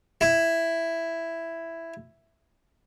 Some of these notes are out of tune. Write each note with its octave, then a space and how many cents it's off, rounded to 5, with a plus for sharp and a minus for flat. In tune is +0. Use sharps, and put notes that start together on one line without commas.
E4 +5